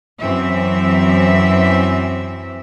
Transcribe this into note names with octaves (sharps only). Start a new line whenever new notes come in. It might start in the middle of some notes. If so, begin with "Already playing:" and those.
F#2 E3 C4 E5